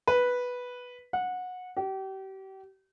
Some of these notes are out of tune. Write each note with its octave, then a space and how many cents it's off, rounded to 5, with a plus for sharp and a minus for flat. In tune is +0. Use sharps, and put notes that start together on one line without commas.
B4 -5
F#5 -20
G4 -35